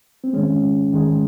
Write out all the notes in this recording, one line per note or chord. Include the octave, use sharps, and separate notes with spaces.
C4
G#2 D#3 G#3 C#4
G#2 D#3 G#3